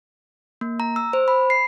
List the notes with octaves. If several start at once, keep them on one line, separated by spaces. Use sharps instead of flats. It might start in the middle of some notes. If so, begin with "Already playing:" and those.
A#3
A#5
E6
C5
B5
C7